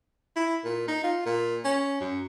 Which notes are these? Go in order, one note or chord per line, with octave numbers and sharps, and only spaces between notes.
E4
A#2
D#4
F4
A#2
C#4
F#2